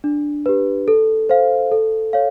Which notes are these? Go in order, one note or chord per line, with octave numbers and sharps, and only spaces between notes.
D4
G4 B4
A4
C5 F5
A4
C#5 F5